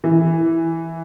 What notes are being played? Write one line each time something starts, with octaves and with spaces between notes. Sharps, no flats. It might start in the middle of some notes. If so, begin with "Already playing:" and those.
E3